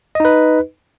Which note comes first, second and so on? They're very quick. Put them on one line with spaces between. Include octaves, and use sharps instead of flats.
D#5 D#4 B4